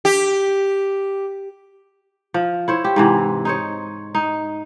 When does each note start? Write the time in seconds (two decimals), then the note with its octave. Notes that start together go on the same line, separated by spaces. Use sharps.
0.05 G4
2.34 F3
2.68 E4 C5 C#5
2.84 G4
2.96 G#2 C3 E3
3.45 D#4 C5 C#5
4.15 D#4